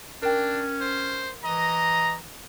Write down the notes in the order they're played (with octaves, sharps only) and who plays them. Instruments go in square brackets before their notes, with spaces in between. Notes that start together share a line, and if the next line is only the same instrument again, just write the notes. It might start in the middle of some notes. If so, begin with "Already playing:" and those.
[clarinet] C#4 [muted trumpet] D4 [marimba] A#4 G5
[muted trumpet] C5
[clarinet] E3 [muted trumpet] D#5 [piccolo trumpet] A#5